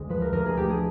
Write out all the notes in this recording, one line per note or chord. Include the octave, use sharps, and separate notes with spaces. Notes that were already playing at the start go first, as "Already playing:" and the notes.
Already playing: D2 G#3
F3 B4
A#4
D2 A#4
G#4
A3 G4
G#4